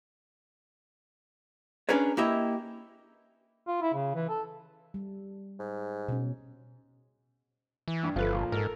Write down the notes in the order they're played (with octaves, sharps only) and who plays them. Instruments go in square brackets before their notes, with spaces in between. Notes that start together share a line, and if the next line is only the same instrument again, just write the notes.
[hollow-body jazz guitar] C#4 D4 G#4 A#4 B4 C#5
A#3 E4 G4 D#5 E5
[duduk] F4
E4
C#3
E3
A4
[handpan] G3
[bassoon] G#2
[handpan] B2 C#4
[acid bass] E3
[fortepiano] G2
[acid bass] G1 [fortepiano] F3 A3 B4
[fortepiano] A#2 F3
[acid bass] G#2 [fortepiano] A4 A#4